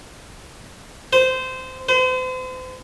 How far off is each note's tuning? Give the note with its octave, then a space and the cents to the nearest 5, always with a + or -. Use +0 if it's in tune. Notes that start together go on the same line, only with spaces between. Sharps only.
C5 -20
C5 -40